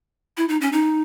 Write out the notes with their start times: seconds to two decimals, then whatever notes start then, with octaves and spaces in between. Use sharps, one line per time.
0.37 E4
0.49 D#4
0.61 C#4
0.72 D#4